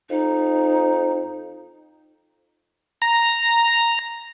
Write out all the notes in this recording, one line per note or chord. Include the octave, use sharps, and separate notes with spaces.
F2 D#4
A#5